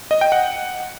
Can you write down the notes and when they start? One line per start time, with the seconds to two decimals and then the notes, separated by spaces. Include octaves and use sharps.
0.11 D#5
0.21 G5
0.32 F#5